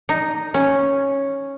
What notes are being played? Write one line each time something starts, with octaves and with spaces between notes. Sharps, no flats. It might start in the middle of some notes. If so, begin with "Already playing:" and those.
D#4
C#4